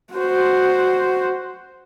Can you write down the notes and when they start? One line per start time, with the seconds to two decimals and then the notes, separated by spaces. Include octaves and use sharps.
0.14 F#4 C5